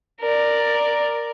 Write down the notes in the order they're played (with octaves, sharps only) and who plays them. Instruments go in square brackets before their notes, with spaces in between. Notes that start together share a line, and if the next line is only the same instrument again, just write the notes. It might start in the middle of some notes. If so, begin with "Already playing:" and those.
[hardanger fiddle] A#4 D5